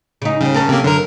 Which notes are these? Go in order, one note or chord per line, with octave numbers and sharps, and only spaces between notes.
C#3 D#4
D#2 C#3 G3
C#4 A4 A#4
C3 A#3
F#2 D3 A#4